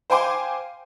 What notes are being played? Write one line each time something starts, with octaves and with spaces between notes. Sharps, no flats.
C5 F5 G5 G#5 C6 D6